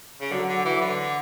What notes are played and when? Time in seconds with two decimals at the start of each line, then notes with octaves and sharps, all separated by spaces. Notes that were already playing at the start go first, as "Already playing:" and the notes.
0.21 C#3
0.31 D3 F#3
0.48 D3
0.65 E3
0.81 D3